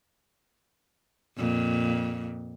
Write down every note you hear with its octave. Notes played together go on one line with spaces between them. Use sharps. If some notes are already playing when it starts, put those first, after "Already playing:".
F2 A#2